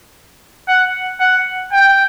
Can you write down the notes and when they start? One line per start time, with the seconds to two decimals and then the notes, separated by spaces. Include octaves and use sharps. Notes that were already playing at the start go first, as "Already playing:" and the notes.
0.68 F#5
1.20 F#5
1.72 G5